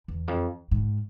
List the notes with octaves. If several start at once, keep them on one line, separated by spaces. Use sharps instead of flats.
E2
F2
G#2